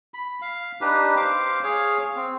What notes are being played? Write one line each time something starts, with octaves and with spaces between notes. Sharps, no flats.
B5
F5
D4 D#4 G4 B4
C5 F5 D6
G#4 C#5 F5
C4